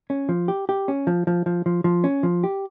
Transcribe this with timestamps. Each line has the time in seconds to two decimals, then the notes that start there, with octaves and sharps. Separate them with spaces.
0.10 C#4
0.29 F3
0.48 G4
0.69 G4
0.88 C#4
1.07 F3
1.27 F3
1.46 F3
1.66 F3
1.84 F3
2.04 C#4
2.23 F3
2.44 G4